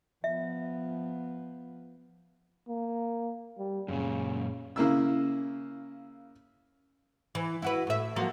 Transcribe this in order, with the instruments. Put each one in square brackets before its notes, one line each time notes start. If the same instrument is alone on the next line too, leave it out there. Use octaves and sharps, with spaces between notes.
[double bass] F3 B3 [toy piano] E5
[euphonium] A#3
G3
[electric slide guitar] F#2 A#2 [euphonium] C#3
[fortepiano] C#3 A#3 E4 E6
[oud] E3
E4 F#4 B4
A2 E5
F3 F#3 A#3